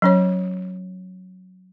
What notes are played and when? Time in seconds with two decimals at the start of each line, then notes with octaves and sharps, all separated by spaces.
0.02 F#3 C#4 C#5